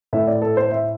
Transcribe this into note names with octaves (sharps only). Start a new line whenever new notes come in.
A2 A3 E4 E5
D5
A4
C5
E5